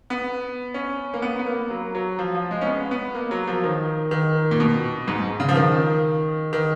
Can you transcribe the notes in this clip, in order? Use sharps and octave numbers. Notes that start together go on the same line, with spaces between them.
B3
C#4
A#3
B3
B3
A#3
F#3
F#3
F3
F3
G#3
C#4
B3
B3
A#3
F#3
F3
D#3
D#3
A#2
B2
G#2
C#3
F3
D#3
D#3